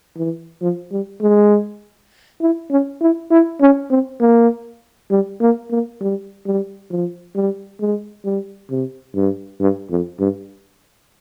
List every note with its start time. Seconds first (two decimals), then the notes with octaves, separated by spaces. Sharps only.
0.17 E3
0.61 F3
0.92 G3
1.22 G#3
2.41 E4
2.71 C#4
3.01 E4
3.31 E4
3.61 C#4
3.90 C4
4.21 A#3
5.11 G3
5.41 A#3
5.71 A#3
6.01 G3
6.46 G3
6.91 F3
7.35 G3
7.80 G#3
8.25 G3
8.70 C3
9.15 G2
9.60 G2
9.90 F2
10.19 G2